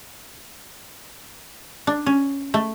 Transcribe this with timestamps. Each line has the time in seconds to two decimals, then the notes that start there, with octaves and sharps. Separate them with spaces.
1.87 D4
2.06 C#4
2.54 A3